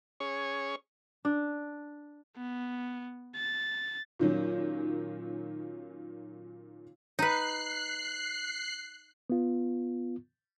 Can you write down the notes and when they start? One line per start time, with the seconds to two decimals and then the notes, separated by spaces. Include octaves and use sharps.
0.20 C#4 G#4 C#5
1.25 D4
2.37 B3
3.36 A6
4.19 A#2 D#3 F#3 C#4
7.19 D#4 B4 F#6 C7
9.30 B3 F4